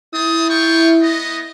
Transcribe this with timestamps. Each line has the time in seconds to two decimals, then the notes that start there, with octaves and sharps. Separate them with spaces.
0.14 C4 E4 A5 D#6
0.49 F4 G5 C#6
1.02 B3 D#5